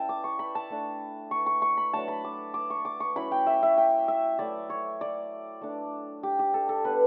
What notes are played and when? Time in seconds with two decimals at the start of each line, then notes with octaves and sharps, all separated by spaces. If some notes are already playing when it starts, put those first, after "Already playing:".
Already playing: G3 C#4 E4 E5 G5 A5
0.09 D6
0.24 C#6
0.39 B5
0.55 A5
0.70 A3 D4
1.31 C#6
1.46 C#6
1.62 C#6
1.77 B5
1.93 F#3 A3 D4 A5
2.08 B5
2.24 D6
2.54 D6
2.70 C#6
2.85 D6
3.00 C#6
3.16 F#3 C#4 E4 B5
3.31 G5
3.46 E5
3.63 E5
3.78 G5
4.08 E5
4.39 F#3 A3 E4 D5
4.70 C#5
5.01 D5
5.61 A3 D4
6.23 G4
6.39 G4
6.54 A4
6.69 A4
6.85 G3 B3 D4 B4